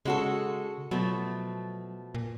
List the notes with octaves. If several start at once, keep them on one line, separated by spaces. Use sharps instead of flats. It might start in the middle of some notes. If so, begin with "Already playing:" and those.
C#3 G#3 F#4 A4
B2 F3 F#3 A3
A#2